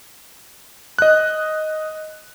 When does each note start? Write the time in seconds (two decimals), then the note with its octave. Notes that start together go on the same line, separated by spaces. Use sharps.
0.99 D#5 F#6